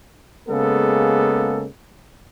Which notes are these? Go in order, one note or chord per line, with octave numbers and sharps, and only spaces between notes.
C#3 G#3 A#3 B3 A4